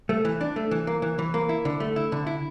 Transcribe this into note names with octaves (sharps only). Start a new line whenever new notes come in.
A3
E3
D4
A3
E3
A#3
E3
E3
A#3
E4
D3
A3
E4
D3
E4